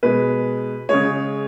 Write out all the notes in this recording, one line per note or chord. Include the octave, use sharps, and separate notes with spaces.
B2 G#3 B4
C#3 G#3 C#5